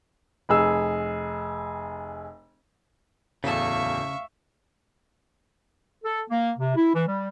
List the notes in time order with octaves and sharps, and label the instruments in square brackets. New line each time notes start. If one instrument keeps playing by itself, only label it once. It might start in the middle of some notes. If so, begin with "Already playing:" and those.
[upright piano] F1 G#4 E6
[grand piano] D1 E2 A4 [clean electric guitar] C#3 A5 [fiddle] E5 C#6 [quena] F5
[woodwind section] A4
A#3
C3
E4
E3
G3